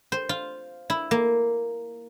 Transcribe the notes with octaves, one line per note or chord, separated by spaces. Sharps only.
C5
F4
E4
A#3